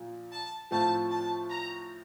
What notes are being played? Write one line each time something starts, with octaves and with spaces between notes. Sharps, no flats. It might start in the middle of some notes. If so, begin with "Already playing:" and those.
Already playing: A#2 F3
A5
A2 F3 A3 C4 F4 A5
A5
A#5